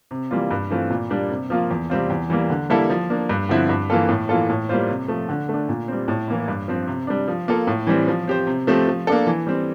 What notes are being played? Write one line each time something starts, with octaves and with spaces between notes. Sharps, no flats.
C3
E3 G3 A#3 F4
G2
E3 A3 C4 F4
A#2
G3 A#3 D4
C3
F3 A#3 F4
E2
C3 G3 C4 F4
E2
E3 G3 A#3
D3
G3 A#3 E4 A4
F3
A#3 D4
G2
D3 F3 C4 E4
G2
E3 A#3 F4 A4
A2
E3 A#3 F4 A4
A2
G3 A#3 F4 C5
C3
F3 A3
D3
A3 D4
A#2
G3 C4
A2
E3 A#3 E4
G2
F3 C4
C3
G3 D4
F3
A#3 F4 A4
A2
E3 G3 C4
F3
C4 G4 C5
C3
F3 A3 C4 G4
F3
A#3 D4 A4
E3
G3 C4